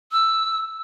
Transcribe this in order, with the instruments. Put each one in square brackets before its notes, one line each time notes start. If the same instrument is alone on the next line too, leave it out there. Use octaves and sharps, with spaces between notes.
[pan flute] E6